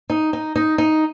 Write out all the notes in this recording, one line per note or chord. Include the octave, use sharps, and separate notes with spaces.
D#4
D#4
D#4
D#4